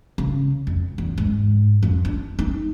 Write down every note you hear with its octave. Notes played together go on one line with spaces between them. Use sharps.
C#3
F2
E2
G#2
F2
D4
D#4